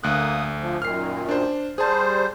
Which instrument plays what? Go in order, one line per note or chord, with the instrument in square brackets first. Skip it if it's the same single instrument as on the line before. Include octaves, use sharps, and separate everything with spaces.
[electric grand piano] D2 F#6 [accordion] A#3 D#6
[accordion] F3
[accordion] F#2 A#2 D#3 [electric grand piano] F6 C7
[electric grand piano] D4 C5
[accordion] G3 C5 [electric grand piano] G#4 A5